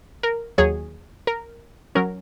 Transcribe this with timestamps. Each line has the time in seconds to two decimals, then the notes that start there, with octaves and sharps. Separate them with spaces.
0.23 A#4
0.58 D#2 D#3 F#3 G#4 C#5
1.27 A#4
1.95 F#3 C#4 A#4